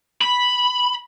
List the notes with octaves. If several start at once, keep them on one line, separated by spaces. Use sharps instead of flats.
B5